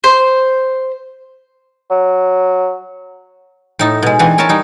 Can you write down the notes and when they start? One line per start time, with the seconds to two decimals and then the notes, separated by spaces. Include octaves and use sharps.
0.04 C5
1.90 F#3
3.79 A2 D#4 A5
4.02 B2 G#3
4.19 E3 C4 D4 F#5 G#5
4.38 E4 A#4 C#5 G#5 A5
4.49 G3 D#4